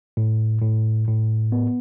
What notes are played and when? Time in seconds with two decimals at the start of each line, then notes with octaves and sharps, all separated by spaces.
0.17 A2
0.62 A2
1.08 A2
1.52 B3